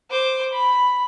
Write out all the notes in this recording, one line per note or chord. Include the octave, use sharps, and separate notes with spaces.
C5 D6
B5